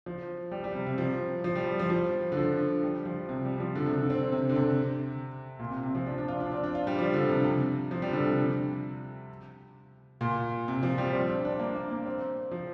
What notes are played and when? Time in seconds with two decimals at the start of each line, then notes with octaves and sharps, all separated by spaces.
0.06 F3
0.51 G3
0.64 G3
0.75 C3
0.86 C3
0.98 F3
1.44 F3
1.55 G3
1.79 F3
1.90 F3
2.32 D3
2.37 F3
2.83 G3
3.05 F3
3.29 C3
3.45 G3
3.60 F3
3.75 D3
3.86 C3
3.98 D3
4.10 C4
4.32 C3
4.49 D3
4.55 C3
5.59 A#2
5.71 C3
5.83 C3
5.95 F3
6.06 D4
6.18 D4
6.28 F4
6.40 D4
6.51 C4
6.64 D4
6.75 F4
6.87 G3
6.98 F3
7.14 D3
7.29 C3
7.44 C3
7.91 F3
8.02 G3
8.13 D3
8.25 C3
10.21 A#2
10.68 C3
10.83 F3
10.98 G3
11.13 C4
11.30 D4
11.45 D4
11.59 A#3
11.76 A#3
11.91 A#3
12.06 C4
12.51 F3